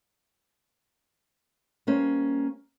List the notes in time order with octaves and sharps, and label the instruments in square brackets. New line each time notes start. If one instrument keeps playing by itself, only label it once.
[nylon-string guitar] G3 A#3 C#4 C5